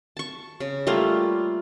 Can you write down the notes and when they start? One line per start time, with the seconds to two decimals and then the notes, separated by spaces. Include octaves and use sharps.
0.17 A5 C#6
0.60 C#3
0.87 G3 A3 A#3 F4